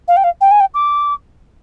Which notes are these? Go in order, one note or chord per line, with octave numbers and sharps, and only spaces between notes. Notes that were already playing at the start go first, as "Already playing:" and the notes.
F5
G5
F5
G5
G#5
G5
D6